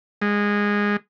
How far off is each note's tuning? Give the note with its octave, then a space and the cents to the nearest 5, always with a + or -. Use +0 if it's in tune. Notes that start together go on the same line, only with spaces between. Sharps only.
G#3 -15